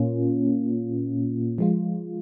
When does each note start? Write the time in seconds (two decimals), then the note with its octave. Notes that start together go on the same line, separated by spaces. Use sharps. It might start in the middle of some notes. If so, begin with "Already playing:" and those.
Already playing: A#2 A#3 C#4 F4
1.58 F3 G#3 F4